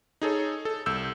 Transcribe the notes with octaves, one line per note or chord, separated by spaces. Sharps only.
D#4 G#4 A4 C#5
A4
C2 E6 G6